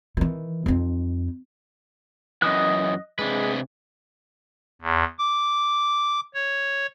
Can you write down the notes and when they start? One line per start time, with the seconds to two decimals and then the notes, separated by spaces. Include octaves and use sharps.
0.17 D#3 E3
0.66 F2 D#4
2.42 F#2 E3 D#5 D#6 F#6
3.19 C3 G#3 D4 B4
4.81 E2
5.18 D6
6.34 C#5